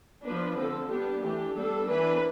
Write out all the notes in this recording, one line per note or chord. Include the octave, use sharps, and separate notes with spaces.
F3 B3 D4 B4
D3 F3 C4 A4
G3 B3 D4 G4
E3 A3 D4 G4
G3 B3 D4 A4
E3 B3 D4 B4